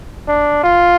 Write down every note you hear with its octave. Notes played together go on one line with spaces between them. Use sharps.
D4
F4